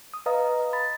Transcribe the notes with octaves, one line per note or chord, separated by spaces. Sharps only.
D#6
B4 D#5 F5 A#5 D#6
B5 A6